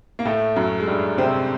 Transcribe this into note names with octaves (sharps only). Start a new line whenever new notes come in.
A#3
A2 A3
F#2 F#3
G#3
G2 G3
C3 C4